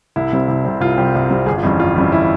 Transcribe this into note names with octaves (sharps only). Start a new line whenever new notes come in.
C2 E4
C3 G3 C4
C2
C3 G3 C4
C2 F4
C3 G3 C4 G4
C2
C3 G3 C4
G1 G#4
F4
F2 E3 G3 C#4
G1 F4
F2 E3 G3 C#4
E4